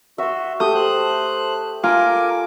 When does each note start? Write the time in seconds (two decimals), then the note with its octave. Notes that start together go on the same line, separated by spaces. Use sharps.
0.18 F#4 E5 C6
0.60 A3 G4 D#6 G6
0.75 C5 F#6
1.84 F4 A#4 G#5 D6